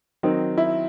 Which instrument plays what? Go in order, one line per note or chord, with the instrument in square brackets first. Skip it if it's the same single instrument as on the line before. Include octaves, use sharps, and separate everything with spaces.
[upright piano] D#3 F#3 C4 D#4
[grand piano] E4